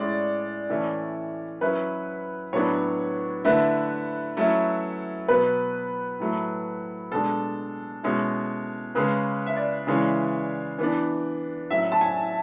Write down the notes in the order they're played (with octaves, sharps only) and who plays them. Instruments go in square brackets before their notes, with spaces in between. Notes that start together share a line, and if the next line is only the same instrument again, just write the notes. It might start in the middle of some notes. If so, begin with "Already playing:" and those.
Already playing: [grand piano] A2 G#3 C#4 E4 [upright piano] D5
[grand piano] A2 E3 A3 C#4 E4
[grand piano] F#3 C#4 E4 [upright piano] B4
[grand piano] A2 F#3 B3 D4 [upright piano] C#5
[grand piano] D3 A3 E4 [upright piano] B4
[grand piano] F#3 A3 C#4 E4
[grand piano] B2 F#3 B3 [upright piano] B4
[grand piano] A2 F#3 A3
[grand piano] B2 G#3 D4 [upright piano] A4
[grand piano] B2 G#3 C#4 E4
[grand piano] C#3 G#3 C#4 [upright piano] B4
[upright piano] E5
D5
[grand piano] C#3 E3 G#3 C#4
E3 B3 D4
[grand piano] A2 F#3 C#4 [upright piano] E5
[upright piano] A5
G#5